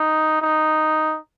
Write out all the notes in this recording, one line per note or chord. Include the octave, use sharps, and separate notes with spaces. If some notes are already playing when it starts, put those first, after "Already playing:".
Already playing: D#4
D#4